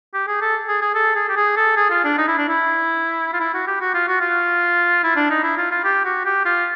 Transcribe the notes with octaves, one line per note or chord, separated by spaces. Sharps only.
G4
G#4
A4
G#4
G#4
A4
G#4
G4
G#4
A4
G#4
F4
D4
D#4
E4
D4
E4
F4
E4
F#4
G4
F#4
F4
F#4
F4
E4
D4
D#4
E4
F4
F4
G4
F#4
G4
F4